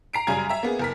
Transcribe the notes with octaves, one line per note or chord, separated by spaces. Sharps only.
A#5 C7 D7
F#2 C#3 G3 G#5 A#5 G#6
E5 A#5
A#3 B3 G#4
F#1 A#4 B6